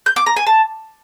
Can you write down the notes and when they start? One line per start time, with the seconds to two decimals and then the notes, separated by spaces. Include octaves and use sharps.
0.06 G6
0.16 D6
0.26 A#5
0.36 G#5
0.47 A5